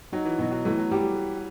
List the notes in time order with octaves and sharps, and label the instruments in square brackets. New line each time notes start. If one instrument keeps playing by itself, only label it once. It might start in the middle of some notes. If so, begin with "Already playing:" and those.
[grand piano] F#3 [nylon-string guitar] D#4
[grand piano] E3
[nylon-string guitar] B2 [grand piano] F#3
[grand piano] F#3
[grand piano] E3 [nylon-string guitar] A3
[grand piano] F#3
[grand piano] G3 [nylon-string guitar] G4